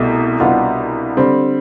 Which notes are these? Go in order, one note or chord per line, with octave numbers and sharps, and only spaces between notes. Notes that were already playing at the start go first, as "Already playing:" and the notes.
Already playing: C2 B2 A3
C2 B2 B3 D4 F4
D3 G3 C4